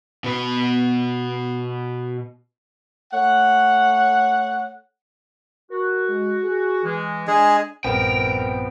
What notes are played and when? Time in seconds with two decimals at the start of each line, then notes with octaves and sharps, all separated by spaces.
0.24 B2 B4
3.13 A3 C#5 F#5
5.71 F#4 A#4
6.09 G#3
6.44 G#4
6.84 E3 G#3
7.27 G#3 D4 G#4 G#5
7.85 A#1 G2 F3 B3 C4 A#4 G5